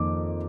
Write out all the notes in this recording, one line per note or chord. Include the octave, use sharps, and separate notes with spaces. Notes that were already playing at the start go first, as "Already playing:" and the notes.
Already playing: F2 D#3 A#3 D6